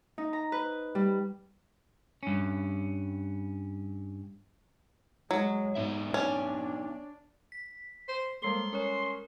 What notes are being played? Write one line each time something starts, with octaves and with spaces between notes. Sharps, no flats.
D#4
A#5
B4
G3
G2 C#4
F#3 G#3
G#2 B3 D#4 E5
C#4 D4
B6
C5
G3 G#3 A#3 A4 C6
C#4 A#4 C#5